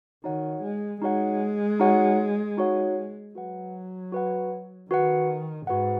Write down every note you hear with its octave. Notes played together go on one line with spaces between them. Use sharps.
D#3 D#4 F#4 C#5 F#5
G#3
G#3 D#4 F#4 C#5 F#5
D#4 F#4 C#5 F#5
D#4 F#4 C#5 F#5
F#3 F#4 B4 F#5
F#4 B4 F#5
D#3 F#4 B4 F#5
G#2 F#4 B4 F#5